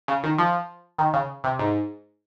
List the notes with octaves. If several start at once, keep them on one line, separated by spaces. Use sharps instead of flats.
C#3
D#3
F3
D#3
C#3
C3
G#2